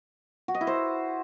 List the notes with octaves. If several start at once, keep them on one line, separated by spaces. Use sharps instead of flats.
F#4
D#5
E4
C5